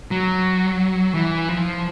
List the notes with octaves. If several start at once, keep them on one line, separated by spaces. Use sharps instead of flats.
F#3
E3
F3